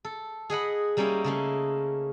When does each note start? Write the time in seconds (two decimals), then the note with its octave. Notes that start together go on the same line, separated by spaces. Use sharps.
0.05 A4
0.50 G#4 D#5 F#5 B5
0.97 G3 A#3 C#4 D#4 E4
1.24 C#3 A3 A#3